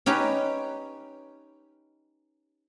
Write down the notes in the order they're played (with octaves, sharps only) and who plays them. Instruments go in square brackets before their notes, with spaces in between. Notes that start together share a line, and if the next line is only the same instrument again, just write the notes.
[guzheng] C#4 D#4 G4 B4